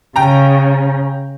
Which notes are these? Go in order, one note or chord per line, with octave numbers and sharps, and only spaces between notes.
C#3 G5 A#5